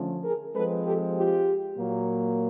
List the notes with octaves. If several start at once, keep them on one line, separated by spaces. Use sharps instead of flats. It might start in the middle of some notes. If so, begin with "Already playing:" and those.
Already playing: D3 F3 A3 C#4
G#4 A#4
F3 G#3 C4 A4 B4
G4 A4
F4 G4
A#2 F#3 A#3